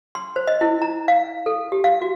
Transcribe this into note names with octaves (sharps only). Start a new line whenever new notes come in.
C6
C5
D#5
E4
A#5
F5
A4
G4
F5
F#4